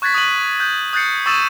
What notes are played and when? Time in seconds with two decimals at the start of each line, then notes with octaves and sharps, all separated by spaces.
0.02 C#6 F#6 G#6 A6 B6
0.14 D#6 F#6 D#7 F#7
0.60 F#6 G6
0.93 D#6 F#6 G6 A6 C7 C#7
1.26 C#6 D#6 E6 A6 D#7 E7